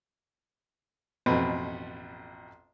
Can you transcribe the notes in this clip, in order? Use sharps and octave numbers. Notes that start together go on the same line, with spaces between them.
A1 F2 B2 B4